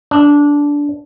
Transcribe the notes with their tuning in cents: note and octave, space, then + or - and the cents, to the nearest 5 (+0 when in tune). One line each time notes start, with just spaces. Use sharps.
D4 -15